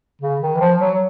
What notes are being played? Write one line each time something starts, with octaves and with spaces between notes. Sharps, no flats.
C#3
D#3
E3
F3
F#3